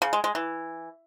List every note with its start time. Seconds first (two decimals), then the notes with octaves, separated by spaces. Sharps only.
0.02 C#3
0.13 G#3
0.24 G#3
0.35 E3